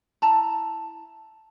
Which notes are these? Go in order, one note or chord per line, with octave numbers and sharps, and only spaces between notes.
E4 A5 A#5